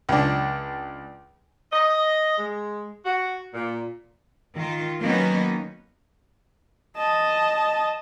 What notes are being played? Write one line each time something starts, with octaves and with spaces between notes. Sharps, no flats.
C#2 D4
D#5
G#3
F#4
A#2
D#3 F4
D#3 F#3 A#3 B3 C#4 D#4
D#5 A5